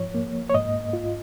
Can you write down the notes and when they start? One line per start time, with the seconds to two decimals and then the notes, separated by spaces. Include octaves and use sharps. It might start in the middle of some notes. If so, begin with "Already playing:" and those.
Already playing: G#2 F3 C#5
0.15 A#3
0.50 C#5
0.54 G#2 D#5
0.93 F4